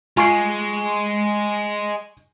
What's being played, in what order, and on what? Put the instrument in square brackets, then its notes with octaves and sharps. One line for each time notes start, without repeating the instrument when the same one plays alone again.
[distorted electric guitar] G#3 [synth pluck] F4 C7 [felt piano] G#5 C#6 D7